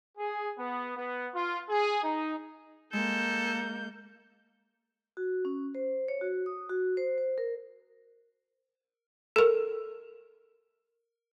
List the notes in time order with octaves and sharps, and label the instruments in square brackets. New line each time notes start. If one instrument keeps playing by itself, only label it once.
[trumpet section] G#4
B3
B3
F4
G#4
D#4
[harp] G#3 [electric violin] A#3 G6 [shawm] A4
[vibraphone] F#4
C#4
C5
C#5
F#4
D#6
F#4
C5
C5
A#4
[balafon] A4 A#4